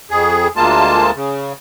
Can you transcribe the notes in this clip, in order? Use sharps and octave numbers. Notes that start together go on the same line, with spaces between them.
F2 G#4
D2 G#3 A#3 F4 A5
C#3